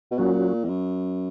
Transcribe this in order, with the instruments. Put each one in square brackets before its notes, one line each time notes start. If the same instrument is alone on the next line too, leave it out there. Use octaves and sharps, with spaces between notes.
[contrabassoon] B2
[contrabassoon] A#2 [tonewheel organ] F#3 A#3 C#4 F#4
[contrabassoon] E2
F#2